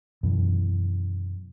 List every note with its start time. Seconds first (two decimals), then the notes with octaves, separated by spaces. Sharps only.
0.23 F#2 B2 E3